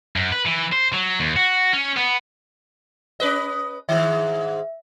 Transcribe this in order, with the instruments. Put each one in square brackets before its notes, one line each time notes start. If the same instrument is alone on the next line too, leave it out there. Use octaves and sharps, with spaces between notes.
[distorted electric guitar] F#2
B4
E3
C5
F#3
D#2
F#4
C#4
B3
[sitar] C#4 B4 D#5
[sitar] G#2 D#3 [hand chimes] E5